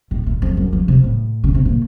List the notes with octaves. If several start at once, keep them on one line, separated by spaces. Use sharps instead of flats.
A2
A2
F2
F#2
F3
C3
A2
C#3
C3
A#2